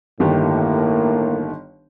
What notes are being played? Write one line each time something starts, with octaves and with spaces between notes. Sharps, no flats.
G1 A2 D#3 A#3 G4